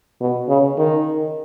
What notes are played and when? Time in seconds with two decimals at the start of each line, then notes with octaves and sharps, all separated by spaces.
0.21 B2
0.49 C#3
0.78 D#3